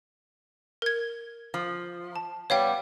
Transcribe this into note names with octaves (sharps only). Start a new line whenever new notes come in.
A#4 G#6
F3
A5
G3 B3 C#5 F5 G5